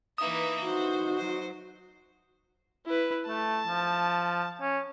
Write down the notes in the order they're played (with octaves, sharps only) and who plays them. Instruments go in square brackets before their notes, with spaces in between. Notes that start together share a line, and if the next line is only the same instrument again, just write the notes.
[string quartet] E3 A#3 D#4 [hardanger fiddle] B4 E5 [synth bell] D#6
[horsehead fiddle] D#4 F#4 [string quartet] C5
[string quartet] F#3 [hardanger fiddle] C5
[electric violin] E4 B4
[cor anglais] A3 [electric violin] A5
[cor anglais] F3
C#4